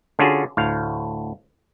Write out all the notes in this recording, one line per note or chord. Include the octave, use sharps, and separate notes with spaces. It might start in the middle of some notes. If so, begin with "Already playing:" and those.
D3 C#4 D4 F4 F#4 G#4
D2 A2 F5